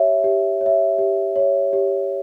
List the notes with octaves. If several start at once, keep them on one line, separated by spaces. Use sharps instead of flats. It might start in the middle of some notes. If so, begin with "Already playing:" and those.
Already playing: G4 C#5 E5
G4
C#5
E5
G4
C#5 E5
G4